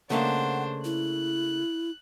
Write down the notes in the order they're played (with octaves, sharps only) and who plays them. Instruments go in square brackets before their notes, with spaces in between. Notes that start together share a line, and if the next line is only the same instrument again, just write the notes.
[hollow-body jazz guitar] C#3 A3 A#3 [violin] D4 C5 [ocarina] F#5
[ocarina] E4 [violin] F#6